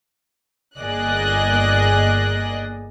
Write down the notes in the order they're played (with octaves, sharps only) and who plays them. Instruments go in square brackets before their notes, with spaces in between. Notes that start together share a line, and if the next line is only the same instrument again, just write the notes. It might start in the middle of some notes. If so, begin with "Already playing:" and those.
[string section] G1 A#3 G#4 D5 D#5 F#6